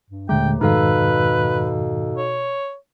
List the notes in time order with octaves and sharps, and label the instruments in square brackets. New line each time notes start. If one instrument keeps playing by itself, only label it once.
[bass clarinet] G2
[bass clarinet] D#2 [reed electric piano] A#2 D3 G#3 [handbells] A3 [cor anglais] G5
[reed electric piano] F2 G#2 D#3 [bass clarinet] B2 [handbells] D#4 A4 F5 [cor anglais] B4
[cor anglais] C#5